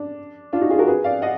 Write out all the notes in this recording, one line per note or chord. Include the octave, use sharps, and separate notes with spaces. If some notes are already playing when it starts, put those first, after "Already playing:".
Already playing: D4
D4 F4
D#4 F#4
F4 G#4
F#4 A#4
G#4 B4
D5 F5
D#5 F#5